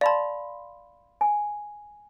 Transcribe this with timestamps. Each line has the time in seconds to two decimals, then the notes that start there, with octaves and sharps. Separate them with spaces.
0.01 D5 F5 A5 B5 C6
1.21 G#5